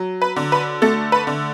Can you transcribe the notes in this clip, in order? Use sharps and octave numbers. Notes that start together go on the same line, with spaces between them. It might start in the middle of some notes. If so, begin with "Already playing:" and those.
Already playing: F#3
B4
D3
B4
A3 A4
B4
D3